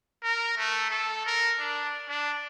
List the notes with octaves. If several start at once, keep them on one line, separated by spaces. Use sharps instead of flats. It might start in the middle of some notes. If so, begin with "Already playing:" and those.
A#4
A3
A4
A#4
D4
D4